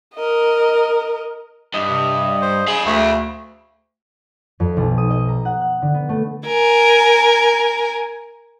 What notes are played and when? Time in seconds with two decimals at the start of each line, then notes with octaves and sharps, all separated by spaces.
0.15 A#4 D#5
1.74 G2 D#5
1.89 C3
2.42 C5
2.68 G#4 F5 B5
2.86 D2 A3
4.60 F2
4.77 B1
4.98 D#6
5.10 D#5
5.29 A#5
5.45 F#5
5.61 F#6
5.82 D3
5.94 B3
6.09 A3
6.46 A#4 G#5